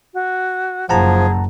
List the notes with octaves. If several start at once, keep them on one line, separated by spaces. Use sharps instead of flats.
F#4
F#1 F3 G#4 F#5 A5 A#5